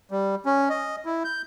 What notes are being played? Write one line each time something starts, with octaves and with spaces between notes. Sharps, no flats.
G3
C#4
D#5
E4
G6